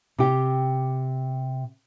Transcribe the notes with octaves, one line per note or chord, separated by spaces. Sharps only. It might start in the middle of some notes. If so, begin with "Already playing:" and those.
C3 G4